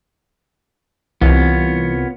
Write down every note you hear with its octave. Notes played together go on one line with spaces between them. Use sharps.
C2 E3 B3 F4 C#5